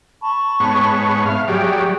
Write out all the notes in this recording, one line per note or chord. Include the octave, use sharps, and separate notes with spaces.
A5 B5 C#6
G#2 B3 C#5
E5 F5
F#3 G3 G4 G#4 G5